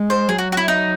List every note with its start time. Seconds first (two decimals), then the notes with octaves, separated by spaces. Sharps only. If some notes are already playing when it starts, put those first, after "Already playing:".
Already playing: G#3
0.10 C5
0.28 F#3 G#4
0.38 F#4
0.52 F#4
0.57 E4
0.68 D#4